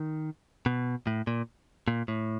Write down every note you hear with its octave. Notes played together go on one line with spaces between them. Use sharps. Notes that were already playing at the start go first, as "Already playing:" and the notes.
Already playing: D#3
B2
A2
A#2
A#2
A2